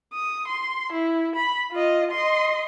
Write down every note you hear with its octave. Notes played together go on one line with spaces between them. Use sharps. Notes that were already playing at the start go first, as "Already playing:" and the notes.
D#6
C6
E4
B5
F4 D#5
D#5 C6